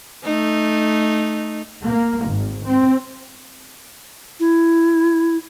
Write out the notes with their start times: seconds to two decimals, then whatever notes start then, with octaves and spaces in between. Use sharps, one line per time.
0.24 A3 D#4
1.85 A#3
2.27 G#1
2.65 C4
4.40 E4